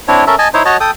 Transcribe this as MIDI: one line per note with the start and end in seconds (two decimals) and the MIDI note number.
0.08 0.24 60
0.08 0.24 62
0.08 0.24 64
0.08 0.24 73
0.27 0.35 61
0.27 0.35 69
0.27 0.35 70
0.27 0.35 76
0.39 0.48 75
0.39 0.48 80
0.39 0.48 81
0.54 0.63 63
0.54 0.63 64
0.54 0.63 72
0.54 0.63 73
0.65 0.77 66
0.65 0.77 73
0.65 0.77 75
0.65 0.77 81
0.80 0.91 69
0.80 0.91 79
0.80 0.91 87